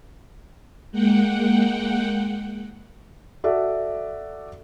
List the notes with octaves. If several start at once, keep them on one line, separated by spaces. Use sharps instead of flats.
G#3 A#3 F#5 G5
F#4 A4 D5 E5